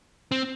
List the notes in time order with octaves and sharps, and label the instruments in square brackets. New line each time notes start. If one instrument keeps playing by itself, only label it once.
[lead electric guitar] C4